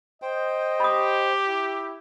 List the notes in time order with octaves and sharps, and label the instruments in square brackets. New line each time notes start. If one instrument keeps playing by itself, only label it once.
[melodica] C5 G5 [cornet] D#5
[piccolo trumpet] G4 [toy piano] B5 D#6
[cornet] E4